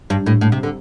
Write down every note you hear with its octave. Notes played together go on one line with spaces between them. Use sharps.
G2
A2
A2
C3
D3